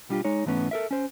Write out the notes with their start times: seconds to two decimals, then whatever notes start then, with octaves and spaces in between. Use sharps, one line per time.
0.09 B1 G3 D4 F4 G4
0.25 G#3 D#4 C#5
0.46 G#2 E3 A3 B3 C#4
0.71 A4 A#4 E5
0.91 C#4 C5